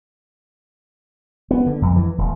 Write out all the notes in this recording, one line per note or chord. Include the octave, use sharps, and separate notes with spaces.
B3
D3
F2
E3
D#1